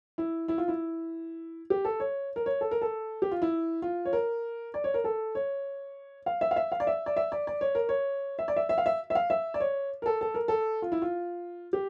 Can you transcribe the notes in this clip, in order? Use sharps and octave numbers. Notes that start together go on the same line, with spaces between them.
E4
E4
F4
E4
G4
A4
C#5
A#4
C#5
A4
A#4
A4
G4
F4
E4
F4
C#5
A#4
D5
C#5
A#4
A4
C#5
F5
E5
F5
E5
F5
D5
E5
D5
E5
D5
D5
C#5
A#4
C#5
E5
D5
E5
E5
F5
E5
E5
F5
E5
D5
C#5
A#4
A4
A4
A#4
A4
F4
E4
F4
G4